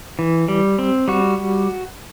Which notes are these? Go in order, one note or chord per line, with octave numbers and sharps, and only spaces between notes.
E3
G3
C4
G3 F#4